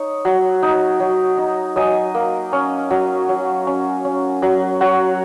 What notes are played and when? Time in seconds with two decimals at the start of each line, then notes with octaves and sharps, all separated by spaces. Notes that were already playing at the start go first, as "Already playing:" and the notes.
Already playing: D#4 C#5
0.25 F#3
0.63 D#4
1.00 F#3
1.38 D#4
1.76 F#3 D#5 G#5
2.15 A#3
2.53 C#4
2.90 F#3
3.29 F#3
3.67 C#4
4.05 C#4
4.42 F#3
4.81 F#3 C#5 F#5